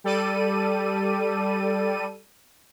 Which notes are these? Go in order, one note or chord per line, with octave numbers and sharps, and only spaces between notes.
G3 A4 D5 D#7